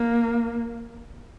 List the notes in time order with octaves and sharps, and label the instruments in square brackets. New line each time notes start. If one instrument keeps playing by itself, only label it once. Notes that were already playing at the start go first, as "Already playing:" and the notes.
Already playing: [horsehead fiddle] A#3